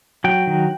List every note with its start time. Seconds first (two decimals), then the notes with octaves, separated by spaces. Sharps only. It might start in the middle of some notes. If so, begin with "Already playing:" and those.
0.24 F#3 G5
0.47 D#3